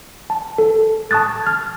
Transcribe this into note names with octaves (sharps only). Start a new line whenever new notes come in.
A5
A4
A5 C#6 D#6 F#6 A6
F6 G#6